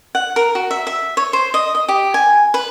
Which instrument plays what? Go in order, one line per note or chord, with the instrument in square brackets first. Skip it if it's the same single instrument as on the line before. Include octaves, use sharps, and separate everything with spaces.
[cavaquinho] F#5
A#4
F#4
E5
E5
C#5
C5
D#5
D#5
G4
G#5
B4